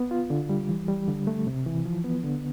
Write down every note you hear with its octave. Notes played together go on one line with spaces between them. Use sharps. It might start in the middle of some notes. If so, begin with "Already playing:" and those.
Already playing: B3
F4
D3
G3
E3
G3
D3
A3
C3
E3
F3
B3
D3